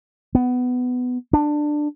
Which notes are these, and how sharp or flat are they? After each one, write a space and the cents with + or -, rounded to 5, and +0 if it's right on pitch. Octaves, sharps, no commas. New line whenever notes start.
B3 +15
D4 +15